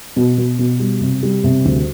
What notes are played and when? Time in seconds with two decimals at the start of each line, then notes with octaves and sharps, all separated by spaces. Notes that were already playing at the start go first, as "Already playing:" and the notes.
0.16 B2
0.38 B2
0.59 B2
0.80 G3
1.01 C3
1.23 G3
1.44 C3
1.65 D2